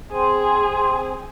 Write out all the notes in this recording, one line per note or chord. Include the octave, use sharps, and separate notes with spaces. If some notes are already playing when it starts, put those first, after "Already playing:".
C4 G#4 C5